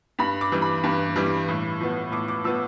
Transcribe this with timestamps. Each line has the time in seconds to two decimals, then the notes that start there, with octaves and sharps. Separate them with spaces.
0.19 G2 B5
0.41 D6
0.52 E3 G3
0.62 B5
0.84 G2
1.16 E3 G3
1.48 A2
1.80 F3 B3
2.12 A2 D6
2.28 D6
2.44 F3 B3 E6